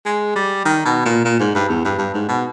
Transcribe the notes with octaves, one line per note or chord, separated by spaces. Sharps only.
G#3
G3
D#3
B2
A#2
A#2
G#2
G2
E2
G2
G2
G#2
B2